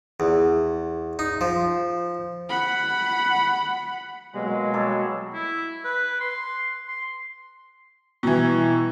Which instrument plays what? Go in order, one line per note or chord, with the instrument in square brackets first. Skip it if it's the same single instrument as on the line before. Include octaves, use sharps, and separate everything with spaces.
[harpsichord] E2
D#4
F3
[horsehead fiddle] F#5 B5
[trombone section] B2 F#3 A#3 [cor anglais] G#3
[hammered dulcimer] G3 A4 C#5
[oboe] E4
B4
C6
C6
[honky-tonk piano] B2 E3 [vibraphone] G3 E4 A#5